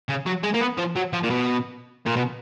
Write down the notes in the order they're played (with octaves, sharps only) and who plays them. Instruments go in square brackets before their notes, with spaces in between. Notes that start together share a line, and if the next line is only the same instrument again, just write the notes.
[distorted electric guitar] C#3
F#3
G#3
A#3
B3
F3
F#3
F3
A#2
B2
A#2
B2